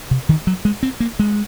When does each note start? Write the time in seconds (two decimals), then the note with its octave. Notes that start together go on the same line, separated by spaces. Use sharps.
0.11 C3
0.29 D#3
0.47 F#3
0.65 G#3
0.83 C4
1.00 A#3
1.19 G#3